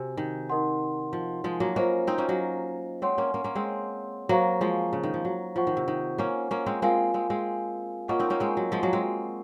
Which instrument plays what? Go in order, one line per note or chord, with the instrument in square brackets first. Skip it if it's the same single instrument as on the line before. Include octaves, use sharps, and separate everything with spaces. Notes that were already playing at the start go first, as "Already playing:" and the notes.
Already playing: [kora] C3 [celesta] F#4 C5 G#5
[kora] D#3
[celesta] D#4 A#4 D#5 F#5 C6
[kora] F3
F3 G#3
F#3 A#3
[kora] A#3 C#4 [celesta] F4 C5 D#5
[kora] C4 D#4
A#3 C#4
F#3 A#3
[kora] G#3 C4 [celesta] C#5 F#5 C6
[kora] A#3 C#4
A#3 C#4
A#3 C#4
G#3 C4
[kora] F#3 A#3 [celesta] C5 F5 A#5 C#6
[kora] F3 G#3
C#3
D#3
F3
F#3
[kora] F3 [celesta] F4 C5 F#5 C#6
[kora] D#3
C3
D#3
A#3 C#4
A#3 C#4
G#3 C4
[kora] G#3 C4 [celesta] F4 A#4 F5 G#5
[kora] G#3 C4
G#3 C4
[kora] A#3 C#4 [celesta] F4 A#4 D#5 F#5 C#6
[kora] C4 D#4
A#3 C#4
G#3 C4
F#3
F3 G#3
F#3 A#3
G#3 C4